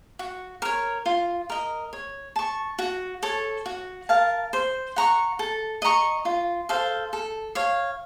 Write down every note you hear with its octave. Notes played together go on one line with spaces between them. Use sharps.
F#4
A#4 C#5
F4
A#4 D#5
C#5
A5 C#6
F#4
A4 C#5
F#4
A#4 F5 A5
C5
F#5 A#5 C#6
A4
D#5 A#5 C#6
F4
A4 C5 F5
A4
C#5 F5